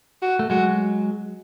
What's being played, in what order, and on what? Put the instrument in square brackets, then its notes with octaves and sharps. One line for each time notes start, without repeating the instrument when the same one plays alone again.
[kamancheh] F#4
[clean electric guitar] A3
[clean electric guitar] F#3 G#3 [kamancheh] F#4